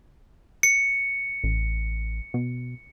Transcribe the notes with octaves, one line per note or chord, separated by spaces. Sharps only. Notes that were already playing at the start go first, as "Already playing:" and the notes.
C#7
A1
B2